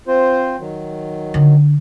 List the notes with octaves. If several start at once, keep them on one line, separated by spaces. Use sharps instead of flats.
C4 F4 C5
D#3 F#3
D3